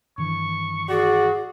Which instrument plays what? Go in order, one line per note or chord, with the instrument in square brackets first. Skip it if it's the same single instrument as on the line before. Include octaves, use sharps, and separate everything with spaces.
[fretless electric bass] G2 D#3 E3 [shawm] C#6
[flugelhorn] F#4 [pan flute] G#4 [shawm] D5